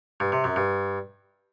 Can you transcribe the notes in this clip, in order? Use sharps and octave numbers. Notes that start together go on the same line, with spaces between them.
G2
C3
F#2
G2